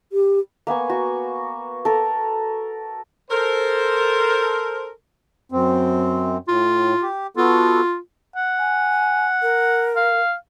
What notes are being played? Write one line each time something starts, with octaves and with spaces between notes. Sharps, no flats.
G4
A#3 B3 G#5 C#6
F#4
A4 A#4
A4 A#4 C5
F#2 C4
A2 F4
G4
B3 F4 F#4 A4
F#5
G#5
A#4
F5